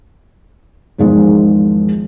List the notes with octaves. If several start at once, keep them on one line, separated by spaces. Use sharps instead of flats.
E2 G#2 D#3 F3 G#3